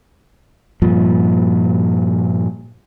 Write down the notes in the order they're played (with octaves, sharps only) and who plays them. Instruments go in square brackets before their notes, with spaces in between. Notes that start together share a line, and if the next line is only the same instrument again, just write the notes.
[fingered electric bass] G2 A#2 F3